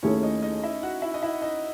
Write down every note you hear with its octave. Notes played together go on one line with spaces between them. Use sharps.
D#2 D#3 A3 C#4 E4 G#4 C#5
D#4 D#5
D#4 D#5
E4 E5
F#4 F#5
E4 E5
D#5
E4 E5
D#4 D#5